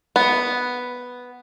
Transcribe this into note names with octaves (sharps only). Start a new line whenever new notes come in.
B3